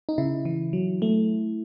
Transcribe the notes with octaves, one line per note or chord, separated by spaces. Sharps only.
D#4
C#3 E4
E3
F#3
A3